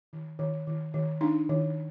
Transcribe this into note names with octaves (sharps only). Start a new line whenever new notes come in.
D#3
D#3
D#3
D#3
D4 D#4
D#3